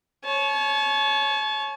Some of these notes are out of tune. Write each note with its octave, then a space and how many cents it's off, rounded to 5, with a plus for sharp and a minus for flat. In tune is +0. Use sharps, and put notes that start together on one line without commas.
C#5 +0 A5 -40